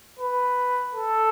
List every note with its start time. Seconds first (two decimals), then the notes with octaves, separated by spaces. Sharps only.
0.19 B4
0.95 A4